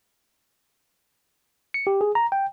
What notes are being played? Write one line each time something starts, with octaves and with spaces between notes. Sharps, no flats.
C#7
G4
G#4
A#5
G5